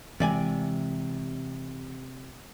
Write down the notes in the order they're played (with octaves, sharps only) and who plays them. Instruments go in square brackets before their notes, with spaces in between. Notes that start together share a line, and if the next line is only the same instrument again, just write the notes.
[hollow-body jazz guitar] C3 D5 G#5 [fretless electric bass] E3 G#3